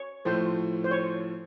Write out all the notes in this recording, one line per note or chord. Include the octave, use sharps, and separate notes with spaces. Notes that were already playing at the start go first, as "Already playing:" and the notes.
Already playing: C#5
A2 F3 A3 C5
C5
C#5